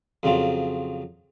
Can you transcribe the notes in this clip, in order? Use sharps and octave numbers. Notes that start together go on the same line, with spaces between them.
F2 C#3 F#3 C4 F4